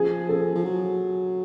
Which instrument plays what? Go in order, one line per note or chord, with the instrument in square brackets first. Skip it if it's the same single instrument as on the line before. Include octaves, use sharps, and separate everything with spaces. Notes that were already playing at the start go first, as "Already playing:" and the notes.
Already playing: [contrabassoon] F3 [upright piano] G#4
[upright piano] A4
[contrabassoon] F3
F#3